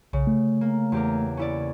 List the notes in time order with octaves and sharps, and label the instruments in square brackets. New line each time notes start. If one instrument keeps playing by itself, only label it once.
[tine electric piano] B1 [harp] C#3
[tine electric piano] A3
[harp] A#3
E2 G4 A#4
C#4 E4 D5